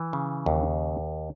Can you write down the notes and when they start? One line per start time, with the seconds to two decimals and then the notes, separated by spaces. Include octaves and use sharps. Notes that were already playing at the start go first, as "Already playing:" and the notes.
Already playing: E3
0.13 C#3
0.46 D#2